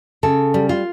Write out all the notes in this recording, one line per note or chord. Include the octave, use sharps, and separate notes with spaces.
C#3 A4
G3
F4